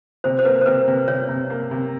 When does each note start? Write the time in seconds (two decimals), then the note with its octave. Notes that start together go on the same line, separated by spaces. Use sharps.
0.24 C3 C5
0.39 C5
0.45 A#3 B4
0.61 C5
0.66 C3 B4
0.88 C3
1.08 C3 C#5
1.29 C3
1.50 A#3
1.71 C3